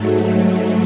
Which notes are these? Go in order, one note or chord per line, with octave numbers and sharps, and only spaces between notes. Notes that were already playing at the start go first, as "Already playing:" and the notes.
Already playing: G#2 F#3 A3